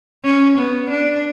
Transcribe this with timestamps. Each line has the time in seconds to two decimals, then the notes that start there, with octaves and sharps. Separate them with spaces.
0.24 C#4
0.58 B3
0.90 D4